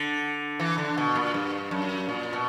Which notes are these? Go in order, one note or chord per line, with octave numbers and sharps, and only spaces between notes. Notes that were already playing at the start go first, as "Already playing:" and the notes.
Already playing: D3
E3
D3
B2
A#2
G2
F#2
A#2
B2